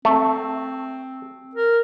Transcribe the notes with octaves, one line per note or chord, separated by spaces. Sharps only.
A3 C4
A#4